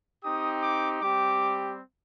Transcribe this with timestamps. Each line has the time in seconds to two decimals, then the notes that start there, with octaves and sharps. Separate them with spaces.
0.24 C4 D#4 G4 D#6
0.62 D6
1.01 G3 C4 G4 D6